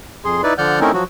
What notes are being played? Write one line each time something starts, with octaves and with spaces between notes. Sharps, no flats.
F2 G#4 C6
D#4 E4 B4 D5
D3 F3 D5 F#5 F6 G6
A3 C4 C#4 D#4 E4 A#4
F3 F#3 F#4